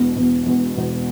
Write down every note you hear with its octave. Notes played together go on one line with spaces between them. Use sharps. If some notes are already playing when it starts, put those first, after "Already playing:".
Already playing: E1 E2 B2
E1 E2 B2
E1 E2 B2
E1 E2 B2